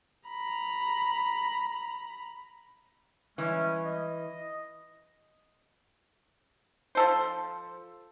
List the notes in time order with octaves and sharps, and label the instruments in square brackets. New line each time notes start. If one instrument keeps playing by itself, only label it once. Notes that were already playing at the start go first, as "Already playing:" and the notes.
[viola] A#5 B5
[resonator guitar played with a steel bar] E3 [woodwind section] G3 G#3 C#4
[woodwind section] D#5
[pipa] F3 A4 C5